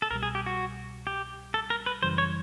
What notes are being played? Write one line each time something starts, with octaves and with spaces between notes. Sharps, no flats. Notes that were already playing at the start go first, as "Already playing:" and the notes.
A4
C2 B2 G3 A#4
G#4
G4
F#4
G4
A4
A#4
B4
F#2 C#3 E3 G3 C5
C#5